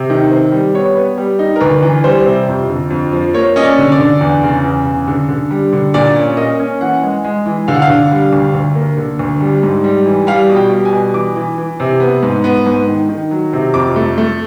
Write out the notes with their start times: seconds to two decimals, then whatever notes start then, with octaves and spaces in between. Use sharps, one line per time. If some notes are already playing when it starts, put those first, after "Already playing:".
Already playing: C3
0.10 D#3
0.31 C4
0.52 G3
0.74 B3 C#5
0.96 B3
1.18 G3
1.39 D#4
1.56 A#4
1.61 D2 B4
1.83 E3
2.04 G3 C5
2.26 C3
2.48 F2
2.69 D3
2.90 F2
3.13 F3
3.34 A#3 C#5
3.56 C#4 D#5
3.64 D5
3.78 D3
3.92 D5
4.00 D3
4.21 E2
4.43 C#3
4.64 E2
4.85 C#3
5.07 D3
5.29 D3
5.51 G3
5.73 D3
5.94 A#2 D5
6.16 C#4
6.37 A#3 D#5
6.60 C#4
6.81 E3 F#5
7.03 G#3
7.24 G#3
7.46 E3
7.68 D3 F5
7.74 F#5
7.82 F5
7.90 D3
8.11 G3
8.33 D2
8.54 D2
8.75 A#3
8.97 D3
9.19 D2
9.41 G3
9.63 G#2
9.84 G3
10.06 E3
10.27 G3 F5
10.49 B2
10.56 G5
10.71 G3
10.85 G#5
10.93 B2
11.14 E3 D6
11.36 E3
11.58 E3
11.80 C3
12.00 B3
12.23 G#2
12.44 B3
12.66 G#2
12.88 D#3
13.09 D#3
13.31 F#3
13.53 C3
13.74 F2 D6
13.96 A3
14.18 A3